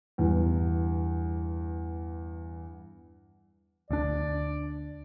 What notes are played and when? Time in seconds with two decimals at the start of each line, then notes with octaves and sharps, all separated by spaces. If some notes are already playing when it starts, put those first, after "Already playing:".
0.18 E2 G2 E3 G3
3.91 D2 D4 D5